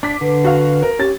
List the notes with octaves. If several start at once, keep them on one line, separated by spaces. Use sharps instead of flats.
D4 D6 B6
D3 B4
F#4 F5
A#4
C#4 G4 A6